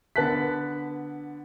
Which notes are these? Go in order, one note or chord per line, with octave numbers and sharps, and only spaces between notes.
D3 B3 A5 F#6 B6